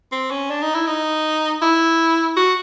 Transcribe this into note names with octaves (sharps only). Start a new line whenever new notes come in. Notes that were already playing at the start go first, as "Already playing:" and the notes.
C4
C#4
D4
D#4
E4
D#4
E4
F#4